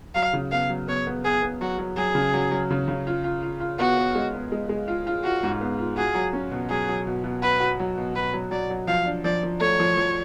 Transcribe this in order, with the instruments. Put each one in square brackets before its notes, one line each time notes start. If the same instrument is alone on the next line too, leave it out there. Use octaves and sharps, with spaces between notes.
[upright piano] F#3 [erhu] F5
[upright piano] C#3
[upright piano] B3 [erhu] F5
[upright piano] F#3
[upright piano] B3 [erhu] C#5
[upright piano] B3
[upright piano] B3 [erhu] G#4
[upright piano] B3
[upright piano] F#3 [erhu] F#4
[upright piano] F#3
[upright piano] F#3 [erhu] G#4
[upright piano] C#3
F#3
F#3
C#3
C#3
F4
F4
F4
F4
[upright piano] B3 [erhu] F#4
[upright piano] B3
G#3
B3
G#3
G#3
F4
F4
[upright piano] F4 [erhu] F#4
[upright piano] G#2
B3
F4
[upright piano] F#4 [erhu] G#4
[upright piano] F#3
C#4
B2
[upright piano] F#3 [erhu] G#4
[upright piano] F#3
B2
B2
[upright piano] F#4 [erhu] B4
[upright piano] F#4
F#3
B2
[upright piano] B2 [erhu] B4
[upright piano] F#3
[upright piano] F#3 [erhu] D5
[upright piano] F#3
[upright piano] F3 [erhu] F5
[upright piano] D4
[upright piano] F3 [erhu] D5
[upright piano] F3
[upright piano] A3 [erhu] C#5
[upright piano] F3
F3